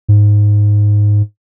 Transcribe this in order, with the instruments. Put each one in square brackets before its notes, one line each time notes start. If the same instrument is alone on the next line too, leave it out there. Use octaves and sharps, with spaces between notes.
[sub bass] G#2